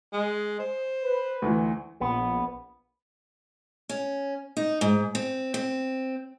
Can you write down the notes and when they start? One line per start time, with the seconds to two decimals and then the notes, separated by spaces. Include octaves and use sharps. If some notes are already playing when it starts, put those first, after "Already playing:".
0.13 G#3
0.59 C5
1.03 B4
1.42 D2 E3
2.01 A#1 B3
3.89 C#4
4.57 D#4
4.81 G#2
5.15 C4
5.54 C4